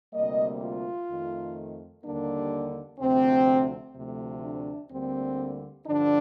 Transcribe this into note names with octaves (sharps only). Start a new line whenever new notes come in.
D2 C3 G3 A#3 D#5
F4
F2 D#3 A3
D#2 D3 G3 A#3 D4
D2 C3 F3 C4
D2 C3 F3 A3
D4
D2 D3 G3 A#3 C4
G2 D3 F3 D4